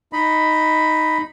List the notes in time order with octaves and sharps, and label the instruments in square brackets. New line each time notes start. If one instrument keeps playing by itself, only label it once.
[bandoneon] D#4 D#5 B5